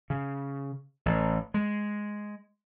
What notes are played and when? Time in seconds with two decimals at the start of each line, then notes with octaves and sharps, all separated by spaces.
0.10 C#3
1.06 A1
1.54 G#3